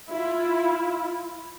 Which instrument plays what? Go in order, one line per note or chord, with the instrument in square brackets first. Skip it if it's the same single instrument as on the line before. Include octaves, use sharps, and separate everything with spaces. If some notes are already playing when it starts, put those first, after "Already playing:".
[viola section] E4 F4